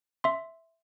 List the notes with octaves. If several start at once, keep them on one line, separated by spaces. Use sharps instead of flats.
E5 C6